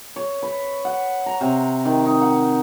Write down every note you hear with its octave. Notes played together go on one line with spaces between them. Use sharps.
C#5
B4
F#5
A#5
C3
D#3
D#4
F#5